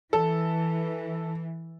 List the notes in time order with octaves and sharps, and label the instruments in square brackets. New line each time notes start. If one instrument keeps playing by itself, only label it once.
[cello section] E3 [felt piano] A4